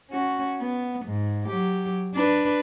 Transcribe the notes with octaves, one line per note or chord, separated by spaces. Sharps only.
C#4 F#4
B3
G#2
F#3 G4
D4 B4